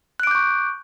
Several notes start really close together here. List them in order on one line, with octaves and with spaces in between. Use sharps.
F#6 D7 D6 G6 C#6